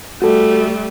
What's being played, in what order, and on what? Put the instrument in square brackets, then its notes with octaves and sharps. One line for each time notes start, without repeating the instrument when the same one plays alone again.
[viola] G3 A3 [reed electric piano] F#4 A4